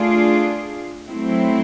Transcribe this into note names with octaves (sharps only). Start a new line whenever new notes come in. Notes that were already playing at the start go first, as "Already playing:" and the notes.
Already playing: A3 D4 F4 G#4
F#3 A3 C4 E4